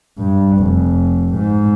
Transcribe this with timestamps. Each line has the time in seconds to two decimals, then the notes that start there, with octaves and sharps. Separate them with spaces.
0.18 G2
0.58 F1
1.35 G#2